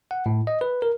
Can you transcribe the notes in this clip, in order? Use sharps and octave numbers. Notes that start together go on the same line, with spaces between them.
F#5
A2
D#5
B4
A#4